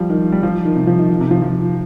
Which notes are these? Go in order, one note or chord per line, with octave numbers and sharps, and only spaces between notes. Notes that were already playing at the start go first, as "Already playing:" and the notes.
Already playing: F3 G3
D#3
G3
F3
D#3
C3
F3
D#3
D#3
C3
F3
F3